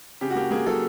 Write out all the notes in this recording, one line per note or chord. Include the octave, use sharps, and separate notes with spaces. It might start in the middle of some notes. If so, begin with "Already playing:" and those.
C#3 G4
F#4
A#3 G4
A#3 G#4
F#3 A4